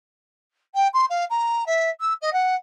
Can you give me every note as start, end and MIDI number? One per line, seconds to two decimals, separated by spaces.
0.75 0.87 79
0.93 1.05 84
1.10 1.24 77
1.30 1.63 82
1.66 1.89 76
2.00 2.13 88
2.21 2.32 75
2.33 2.55 78